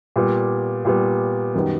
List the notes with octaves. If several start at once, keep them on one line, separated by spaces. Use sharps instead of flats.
A#2 G3 B3
A#2 G3 B3
F#2 D#3 G3 B3